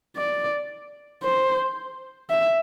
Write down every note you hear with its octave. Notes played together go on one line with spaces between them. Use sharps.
D5
C5
E5